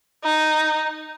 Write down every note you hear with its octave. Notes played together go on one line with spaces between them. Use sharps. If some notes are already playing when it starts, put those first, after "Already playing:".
D#4